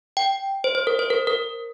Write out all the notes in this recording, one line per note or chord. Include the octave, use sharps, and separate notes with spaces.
G5
C5
C5
A#4
C5
A#4
A#4